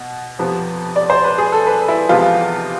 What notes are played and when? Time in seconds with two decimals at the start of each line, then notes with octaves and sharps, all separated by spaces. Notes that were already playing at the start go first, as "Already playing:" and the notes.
Already playing: B2
0.39 F2 C3 F3 B3
0.96 D5
1.10 C5
1.24 B4
1.38 G#4
1.52 A4
1.67 B4
1.88 E4
2.09 E2 C3 F3 G#3 B3 F4